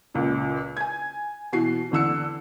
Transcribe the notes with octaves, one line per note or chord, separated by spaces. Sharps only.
C#2 A#2
G#5 G#6
B2 E3 F#4 C7
E2 D3 E6 C#7